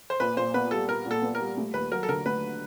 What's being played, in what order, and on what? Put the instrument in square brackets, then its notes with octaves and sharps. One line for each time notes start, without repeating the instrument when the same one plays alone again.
[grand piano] C5
[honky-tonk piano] A#2 [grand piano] B4
[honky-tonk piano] A#2 [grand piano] C5
[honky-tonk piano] B3 [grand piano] B4
[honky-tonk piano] G3 [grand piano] A4
[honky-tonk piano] A#2 [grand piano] A#4
[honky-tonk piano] A#2
[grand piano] A4
[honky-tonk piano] B3
[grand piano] A#4
[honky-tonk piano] G3
A3
[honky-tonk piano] D#2 [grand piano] B4
[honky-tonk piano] F#3 [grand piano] A#4
[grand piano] A4
[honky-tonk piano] D3 [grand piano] A#4
[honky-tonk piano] A3 [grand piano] B4